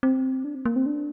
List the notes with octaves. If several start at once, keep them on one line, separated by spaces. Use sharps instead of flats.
C4
D4
C4
A#3
C4
D4